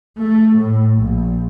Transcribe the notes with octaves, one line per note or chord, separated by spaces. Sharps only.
A3
A2
A#1